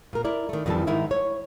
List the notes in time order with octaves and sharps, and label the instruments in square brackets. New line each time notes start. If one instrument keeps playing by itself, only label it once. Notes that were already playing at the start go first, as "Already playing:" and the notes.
[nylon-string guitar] A#2 A#4
E4 A#4 D5
D#3 A3
F2 D#3 E3 G3 A4 A5
G#2 D#3 D#4 E4 A#4 E5
C#5